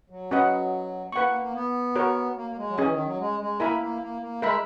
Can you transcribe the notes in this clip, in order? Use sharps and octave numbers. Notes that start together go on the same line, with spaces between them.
F#3
C#4 F#4 B4 D#5 F#5
A#3 B4 F#5 C#6
A#3
A#3
B3
F#4 A#4 C#5
A#3
A#3
G#3
F#3
E3 C#4 G#4 D#5 G#5
D#3
F#3
G#3
G#3
A#3 E4 A#4 E5 G#5 B5
A#3
A#3
A#3
G#3 A#4 E5 B5